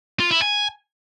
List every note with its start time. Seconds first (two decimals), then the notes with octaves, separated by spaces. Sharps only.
0.20 F4
0.31 E4
0.42 G#5